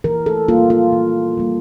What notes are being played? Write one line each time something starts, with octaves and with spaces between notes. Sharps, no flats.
E3 A#4
A4
G3 A#3 F4
F4
E3
G3 A#3